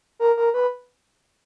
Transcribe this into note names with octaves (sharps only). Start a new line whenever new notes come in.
A#4
A#4
B4